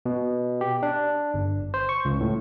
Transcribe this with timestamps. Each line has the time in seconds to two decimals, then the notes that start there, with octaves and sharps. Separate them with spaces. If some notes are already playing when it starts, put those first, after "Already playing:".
0.06 B2
0.61 G4
0.83 D4
1.34 G1
1.74 C5
1.89 C#6
2.05 C#2
2.21 A2